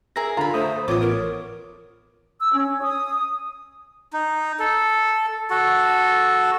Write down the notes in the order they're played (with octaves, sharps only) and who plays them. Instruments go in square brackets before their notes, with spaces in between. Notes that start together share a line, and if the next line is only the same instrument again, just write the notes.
[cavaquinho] G#4 A#4 E5 [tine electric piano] A#6
[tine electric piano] D3 F4 [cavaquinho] A#5 B5
[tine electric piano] A3 D#6 [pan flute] C5
[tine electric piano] A1 B3 C#5 [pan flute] F4 [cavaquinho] D6 D#6
[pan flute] A#4
[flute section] E6
C#4
D#6
[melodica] D#4
A4
F#4 A4